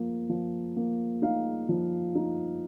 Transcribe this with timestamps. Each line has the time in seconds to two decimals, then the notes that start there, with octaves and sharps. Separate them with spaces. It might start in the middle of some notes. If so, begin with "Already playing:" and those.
Already playing: F3 A#3
0.30 F3
0.76 A#3
1.22 D#4 F5
1.69 F3
2.15 D#4